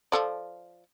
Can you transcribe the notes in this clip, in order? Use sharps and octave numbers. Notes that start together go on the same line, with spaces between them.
F3 A4 D5